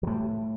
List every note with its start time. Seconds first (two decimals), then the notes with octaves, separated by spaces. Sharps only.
0.03 F#3
0.07 A2 G3